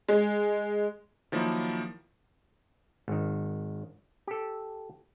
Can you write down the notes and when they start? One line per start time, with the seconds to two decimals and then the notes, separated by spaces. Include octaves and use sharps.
0.09 G#3
1.32 D#3 F3 F#3 A#3 E4
3.08 G#1 D#3
4.27 G4 A4